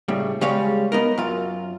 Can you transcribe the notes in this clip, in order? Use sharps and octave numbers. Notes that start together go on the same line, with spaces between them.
A2 C#3 G3
C#3 G3 G#3 C#5 F5
B3 D#4 A#4
F#2 F4